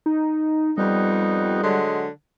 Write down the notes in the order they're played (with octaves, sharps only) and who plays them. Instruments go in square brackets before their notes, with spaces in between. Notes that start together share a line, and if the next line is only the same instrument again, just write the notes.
[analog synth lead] D#4
[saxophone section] F2 B3 D#4 [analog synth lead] G3
[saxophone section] D3 F#3 G#3